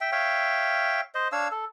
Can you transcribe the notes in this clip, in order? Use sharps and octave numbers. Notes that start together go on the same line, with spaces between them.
E5 G5
C#5 E5 F5 G5
C5 D#5
D4 C#5 F5 E6
A4